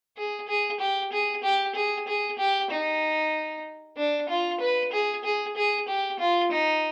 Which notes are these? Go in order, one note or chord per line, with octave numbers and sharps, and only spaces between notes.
G#4
G#4
G4
G#4
G4
G#4
G#4
G4
D#4
D4
F4
B4
G#4
G#4
G#4
G4
F4
D#4